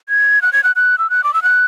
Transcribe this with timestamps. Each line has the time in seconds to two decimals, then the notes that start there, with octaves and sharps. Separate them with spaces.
0.09 G#6
0.42 F#6
0.53 G#6
0.64 F#6
0.76 F#6
0.98 E6
1.10 F#6
1.24 D6
1.34 E6
1.43 F#6